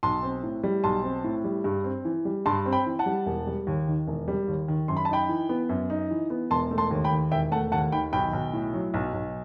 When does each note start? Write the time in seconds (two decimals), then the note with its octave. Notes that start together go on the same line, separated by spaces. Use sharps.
0.03 B1 A5 C6
0.23 C4
0.43 A2
0.64 G3
0.84 B1 A5 C6
1.04 C4
1.24 A2
1.44 G3
1.64 G2
1.84 C4
2.05 E3
2.25 G3
2.46 G2 A5 C6
2.66 C4
2.72 G5 B5
2.86 E3
2.99 F#5 A5
3.06 G3
3.26 E1
3.47 G3
3.67 D#2
3.87 D#3
4.07 E1
4.28 G3
4.48 D#2
4.68 D#3
4.88 F#2 C6
4.97 B5
5.05 A5
5.09 D#4 G5 B5
5.29 E3
5.49 B3
5.69 F#2
5.90 D#4
6.11 E3
6.30 B3
6.51 E1 A5 C6
6.71 A3
6.78 A5 C6
6.91 D#2
7.04 G5 B5
7.11 D#3
7.32 E1 E5 G5
7.51 A3 F#5 A5
7.72 D#2 F#5 A5
7.92 D#3 G5 B5
8.12 B1 G5 B5
8.33 B1
8.53 A2
8.74 F#3
8.94 B1
9.14 B1